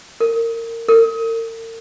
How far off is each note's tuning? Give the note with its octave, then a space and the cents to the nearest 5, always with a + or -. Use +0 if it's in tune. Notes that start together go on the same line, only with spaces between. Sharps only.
A#4 -25
A#4 -45